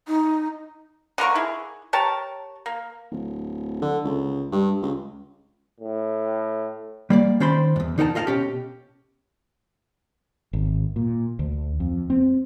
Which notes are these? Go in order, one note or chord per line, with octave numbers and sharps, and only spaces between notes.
D#4
D3 A#3 A#4 C#6
E4 G#4
G4 A#4 C#5 A5
A#3
D1
D3
C#2
G2
C#2
A2
G3 A#3 D5
D#3 C#4 C5 D5 B5 C6
E2 G2
D3 D#4 A#4 F#5 A5
F4 D#5 F5 F#5 A5
B2 C#4 G4
G#1
A#2
D2
F2
C4